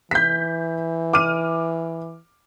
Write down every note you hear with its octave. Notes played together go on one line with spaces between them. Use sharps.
E3 G6 B6
D6 F6 D#7